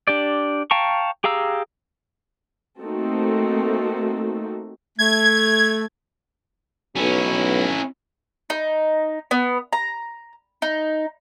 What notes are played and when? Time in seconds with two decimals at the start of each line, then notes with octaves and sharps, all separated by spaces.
0.08 D4 G4 D5
0.71 F5 G5 A5 A#5 C#6
1.24 G4 G#4 F5 A#5 E6
2.81 A3 A#3 C4 D#4 F#4 A4
4.99 A3 G#6
6.96 B1 C#4 E4
8.50 D#4
9.31 B3
9.73 A#5
10.62 D#4